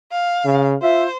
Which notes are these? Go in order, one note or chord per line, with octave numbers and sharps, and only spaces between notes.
F5
C#3
F4 C5 E5